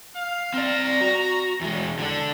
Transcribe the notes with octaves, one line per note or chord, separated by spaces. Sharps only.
F5
C4 D5 A#5
F#4
E2 G#3
D3 D4